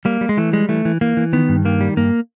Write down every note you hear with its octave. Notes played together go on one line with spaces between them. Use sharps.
G3 A#3
G3
G#3
E3 A3
G3 G#3
E3 A3
E3
E3 A#3
E3
D#3 B3
G2
D#3 A#3
G3
G2 A#3